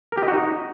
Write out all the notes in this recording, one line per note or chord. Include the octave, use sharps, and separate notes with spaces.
A#4
G4
D#5
F#4
D#4